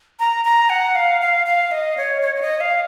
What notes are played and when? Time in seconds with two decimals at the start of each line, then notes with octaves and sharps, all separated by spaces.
0.19 A#5
0.45 A#5
0.70 F#5
0.95 F5
1.22 F5
1.46 F5
1.71 D#5
1.97 C#5
2.22 C#5
2.36 C#5
2.42 D#5
2.60 F5